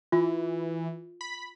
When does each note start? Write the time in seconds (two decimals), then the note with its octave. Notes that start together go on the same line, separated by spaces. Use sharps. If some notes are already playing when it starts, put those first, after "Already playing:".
0.12 E3 F4
1.21 B5